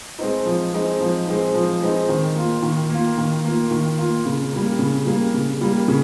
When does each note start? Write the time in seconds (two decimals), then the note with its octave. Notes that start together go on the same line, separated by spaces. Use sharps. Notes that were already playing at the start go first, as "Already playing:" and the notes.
0.19 G#3 C4 D#4
0.46 F3
0.73 G#3 C4 D#4
1.01 F3
1.27 G#3 C4 D#4
1.54 F3
1.81 G#3 C4 D#4
2.09 D#3
2.36 A#3 F4
2.62 D#3
2.90 A#3 F4
3.18 D#3
3.44 A#3 F4
3.71 D#3
3.98 A#3 F4
4.26 C#3
4.52 G3 A#3
4.79 C#3
5.06 G3 A#3
5.34 C#3
5.61 G3 A#3
5.88 C#3